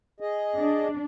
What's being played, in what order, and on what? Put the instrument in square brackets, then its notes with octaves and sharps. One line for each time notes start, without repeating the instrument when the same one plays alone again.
[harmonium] G#4 D#5
[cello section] D4